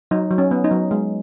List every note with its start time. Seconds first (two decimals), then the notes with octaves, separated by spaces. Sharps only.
0.11 F#3 D#4
0.31 F#3
0.38 C#4
0.51 B3
0.64 D#4
0.71 F#3
0.91 G#3